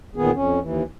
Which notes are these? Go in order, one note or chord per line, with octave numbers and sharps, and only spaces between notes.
E2 A#2 D#3 B3 G#4
F2 C#4
D#2 E3